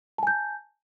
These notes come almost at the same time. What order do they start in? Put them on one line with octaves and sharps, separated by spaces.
A5 G#5 G6